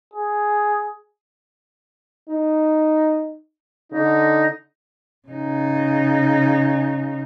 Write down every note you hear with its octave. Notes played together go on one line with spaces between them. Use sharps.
G#4
D#4
D3 D#4
C#3 D#4